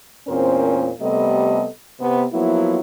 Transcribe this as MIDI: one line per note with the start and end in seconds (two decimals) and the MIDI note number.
0.28 0.90 40
0.28 0.90 46
0.28 0.90 60
0.28 0.90 61
0.28 0.90 70
0.28 0.90 72
1.00 1.67 48
1.00 1.67 55
1.00 1.67 57
1.00 1.67 59
1.00 1.67 69
1.00 1.67 75
2.00 2.26 48
2.00 2.26 59
2.33 2.80 53
2.33 2.80 54
2.33 2.80 58
2.33 2.80 59
2.33 2.80 64